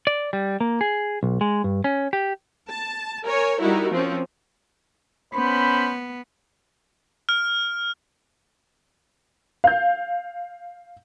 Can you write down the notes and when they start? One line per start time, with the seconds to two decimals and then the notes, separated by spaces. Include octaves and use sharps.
0.07 D5
0.33 G3
0.60 A#3
0.81 G#4
1.23 B1
1.41 G#3
1.64 G2
1.84 C#4
2.13 G4
2.70 A5
3.25 A#4 C#5 G#5
3.60 G3 D#4 E4 F#4 A#4
3.91 F3 C4 C#4
5.34 B3 C#4 C5 B5
7.29 F6
9.64 F5 G6